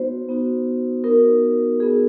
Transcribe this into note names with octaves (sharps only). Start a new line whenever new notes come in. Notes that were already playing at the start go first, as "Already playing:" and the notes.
Already playing: B3 D#4 F#4 C5
B3 D#4 F#4
B3 D#4 F#4 A#4
B3 D#4 F#4 G#4